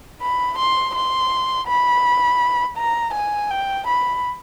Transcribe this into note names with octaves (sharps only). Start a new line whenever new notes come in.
B5
C6
C6
B5
A#5
G#5
G5
B5